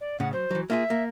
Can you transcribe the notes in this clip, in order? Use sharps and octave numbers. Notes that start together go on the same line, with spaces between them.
D5
A2 C#3 F#5
F#3 C5
E3 F#3
A#3 F4 G#4 E5
A#3